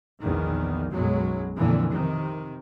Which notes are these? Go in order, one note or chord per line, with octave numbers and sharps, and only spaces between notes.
A#1 E2 D#3
B1 F#2 B2 F#3 G#3
F2 A#2 D3 E3
C3 D#3